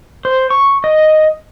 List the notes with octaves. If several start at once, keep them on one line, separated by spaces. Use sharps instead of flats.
C5
C#6
D#5